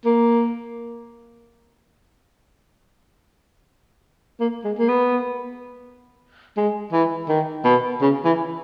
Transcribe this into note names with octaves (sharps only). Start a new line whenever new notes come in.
A#3
A#3
G#3
A#3
B3
G#3
E3
D#3
B2
C#3
E3